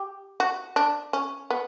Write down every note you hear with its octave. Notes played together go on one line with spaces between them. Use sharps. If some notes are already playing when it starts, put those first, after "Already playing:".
Already playing: G4
F#4
D4
C#4
B3